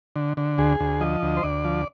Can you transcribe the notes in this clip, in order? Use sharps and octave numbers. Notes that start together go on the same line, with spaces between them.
D3
D3
D2 G#4
D2
F3 D#5
D2
C5
D2 D5
F3